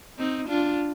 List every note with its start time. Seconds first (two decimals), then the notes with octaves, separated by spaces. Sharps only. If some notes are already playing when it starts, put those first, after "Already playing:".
0.19 C4 D#4
0.48 D4 F4